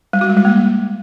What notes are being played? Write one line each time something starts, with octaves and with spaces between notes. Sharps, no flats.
G3
F#4
G#3
G3
A#3